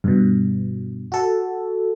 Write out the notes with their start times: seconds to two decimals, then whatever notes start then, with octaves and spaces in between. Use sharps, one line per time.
0.04 G2 B2
1.12 F#4 A4